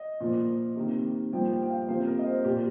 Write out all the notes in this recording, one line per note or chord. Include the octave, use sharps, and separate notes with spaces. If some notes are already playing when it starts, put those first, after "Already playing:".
Already playing: D#5
A#2 F3 A#3
C3 D#3 A#3
G2 F3 A#3 G5
G5
G5
F5
C3 F3 A#3 C5
A#4
D#5
C5
A#2 A#3 G4